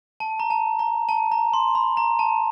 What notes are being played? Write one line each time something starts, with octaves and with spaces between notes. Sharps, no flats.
A5
A#5
A5
A#5
A5
A#5
C6
B5
A#5
A5